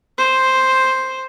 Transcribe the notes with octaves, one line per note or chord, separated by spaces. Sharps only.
C5